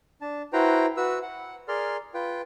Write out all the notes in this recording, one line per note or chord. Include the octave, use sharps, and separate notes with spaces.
D4 A5
E4 F#4 B4 C5 G5 A#5
F#4 B4 E6
F#5
G#4 A#4 D5 C6 F6
F4 B4 G5